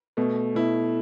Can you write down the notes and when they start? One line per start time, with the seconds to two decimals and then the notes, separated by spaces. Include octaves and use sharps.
0.17 B2 A3
0.55 B2 E4